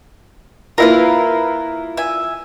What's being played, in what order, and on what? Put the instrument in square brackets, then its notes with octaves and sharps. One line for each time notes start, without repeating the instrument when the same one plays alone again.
[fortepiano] A#3 E4 F4 [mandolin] A#4 B4 F5
[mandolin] E5 G#5